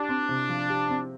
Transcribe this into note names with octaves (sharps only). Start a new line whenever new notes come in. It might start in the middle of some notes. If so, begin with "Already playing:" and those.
Already playing: D4 G4
C4
C3
F3
G4
C4